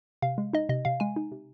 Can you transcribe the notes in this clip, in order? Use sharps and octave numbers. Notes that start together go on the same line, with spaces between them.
C3 F5
G#3
D#4 D#5
C3 D#5
C3 F5
G#3 G#5
D#4
C3